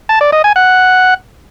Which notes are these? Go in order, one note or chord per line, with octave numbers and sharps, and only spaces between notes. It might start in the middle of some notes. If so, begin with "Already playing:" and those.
A5
D5
D#5
G#5
F#5